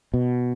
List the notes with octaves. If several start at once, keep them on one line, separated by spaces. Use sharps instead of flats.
B2